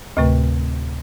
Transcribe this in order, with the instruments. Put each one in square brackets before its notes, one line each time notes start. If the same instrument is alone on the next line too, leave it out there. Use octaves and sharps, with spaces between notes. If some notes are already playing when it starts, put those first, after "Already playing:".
[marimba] D2 A2 C3 A3 B4